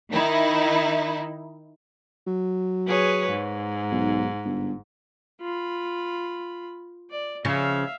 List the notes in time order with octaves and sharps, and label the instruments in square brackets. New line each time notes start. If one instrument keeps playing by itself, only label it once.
[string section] D#3 D#4 E4
[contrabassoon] F#3
[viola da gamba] G#4 B4 C#5
G#2
[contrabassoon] B1
G1
[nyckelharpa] F4 B5
D5
[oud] C#3 F3 [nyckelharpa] E5 F5